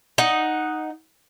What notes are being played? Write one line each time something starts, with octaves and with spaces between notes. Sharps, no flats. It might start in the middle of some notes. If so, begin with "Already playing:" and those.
D#4 F#5